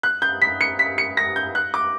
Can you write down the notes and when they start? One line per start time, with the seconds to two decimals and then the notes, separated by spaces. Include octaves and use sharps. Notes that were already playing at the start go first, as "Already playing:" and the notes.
0.03 F#6
0.22 G6
0.42 B6
0.61 C#7
0.79 B6
0.98 C#7
1.17 A#6
1.36 G6
1.55 F#6
1.74 D6